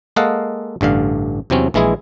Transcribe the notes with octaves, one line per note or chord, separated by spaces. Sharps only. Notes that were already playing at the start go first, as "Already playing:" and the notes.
G#3 A#3 A4 D#5 F5 F#5
A1 G2 D3 F5
E2 C3 F#3 C4 C#4
A#1 E3 G#3 E4 G#4